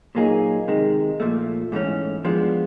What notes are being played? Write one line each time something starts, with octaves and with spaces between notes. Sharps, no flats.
A#2 F#3 A#3 D#4 G#4
C3 D#3 G#3
A#2 F3 A3
G#2 E3 A3 C#4
F3 G#3 B3 D4